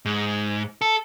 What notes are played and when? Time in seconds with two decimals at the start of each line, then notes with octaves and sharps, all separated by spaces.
0.06 G#2
0.81 A4